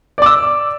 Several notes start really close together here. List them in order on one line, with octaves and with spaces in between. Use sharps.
D5 D6 E6